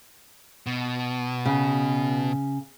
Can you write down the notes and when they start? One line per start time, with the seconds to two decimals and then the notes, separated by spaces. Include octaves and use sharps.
0.66 B2
1.46 C#3